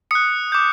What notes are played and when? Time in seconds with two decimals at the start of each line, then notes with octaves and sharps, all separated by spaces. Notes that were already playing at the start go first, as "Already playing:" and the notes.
0.11 D#6 F#6 C#7
0.52 D6 G6